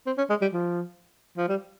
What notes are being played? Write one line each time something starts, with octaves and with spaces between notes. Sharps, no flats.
C4
C#4
G#3
G3
F3
F3
G3